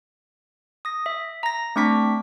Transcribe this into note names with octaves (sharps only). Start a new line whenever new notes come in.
D#6 A#6
E5
A#5 A#6
A3 C4 D4 C#6 D6 B6